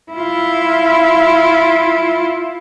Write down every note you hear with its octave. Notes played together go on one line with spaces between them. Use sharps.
E4 F4